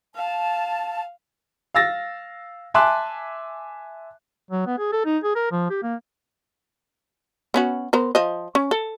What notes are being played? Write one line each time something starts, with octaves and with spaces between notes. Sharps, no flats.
F5 A5
F5 E6 A6 A#6
E5 G#5 A5 C6 D6 F#6
F#3
B3
G#4
A4
D#4
G#4
A#4
F3
G4
A#3
B3 C#4 F#4
B3 A#4 C5
F3 C5 D#5
C#4
A4